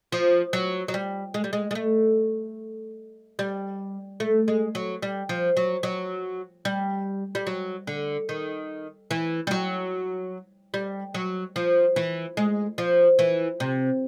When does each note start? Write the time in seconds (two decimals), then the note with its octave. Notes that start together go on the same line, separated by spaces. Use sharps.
0.12 F3
0.53 F#3
0.88 F#3
0.94 G3
1.34 G#3
1.44 G3
1.53 G#3
1.71 G#3
1.75 A3
3.39 G3
4.20 A3
4.48 G#3
4.75 F#3
5.02 G3
5.29 F3
5.57 F#3
5.83 F#3
6.65 G3
7.35 G3
7.47 F#3
7.87 D3
8.29 D#3
9.11 E3
9.47 G3
9.51 F#3
10.74 G3
11.14 F#3
11.56 F3
11.96 E3
12.37 G#3
12.78 F3
13.19 E3
13.60 C3